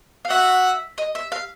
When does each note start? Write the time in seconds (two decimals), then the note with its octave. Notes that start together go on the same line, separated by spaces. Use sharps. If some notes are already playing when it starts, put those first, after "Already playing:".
0.25 F5
0.30 F#4 E5 F#5
0.98 D#5
1.15 E5
1.32 F5